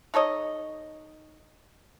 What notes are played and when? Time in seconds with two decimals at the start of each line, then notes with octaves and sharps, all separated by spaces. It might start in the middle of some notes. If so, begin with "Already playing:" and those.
0.14 D#4 A4 C#5 D#5